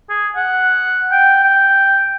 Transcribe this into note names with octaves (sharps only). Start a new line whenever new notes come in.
G#4
F#5
G5
G5